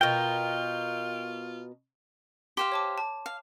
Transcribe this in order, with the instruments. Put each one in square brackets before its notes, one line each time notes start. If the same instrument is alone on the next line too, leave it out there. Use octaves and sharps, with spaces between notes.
[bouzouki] B2 A#4 [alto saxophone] F4 [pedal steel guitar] G5
[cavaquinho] G4 C5 F5 [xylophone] C6
[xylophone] C#5 A5 D6
A5
[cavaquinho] F5